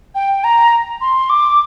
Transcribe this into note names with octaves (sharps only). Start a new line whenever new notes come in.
G5
A#5
C6
D6